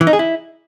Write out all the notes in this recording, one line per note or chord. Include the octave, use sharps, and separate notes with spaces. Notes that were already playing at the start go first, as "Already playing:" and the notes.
E3
D#4
G#4
E4